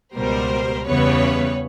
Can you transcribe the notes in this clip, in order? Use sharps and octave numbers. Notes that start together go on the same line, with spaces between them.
C#2 B2 G3 A#4 C5
E2 C#3 E3 G3 B3 B4 C#5